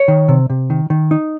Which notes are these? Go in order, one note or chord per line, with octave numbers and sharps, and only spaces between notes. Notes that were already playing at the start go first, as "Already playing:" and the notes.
Already playing: C#5
D#3
C3
C3
D#3
D#3
D#4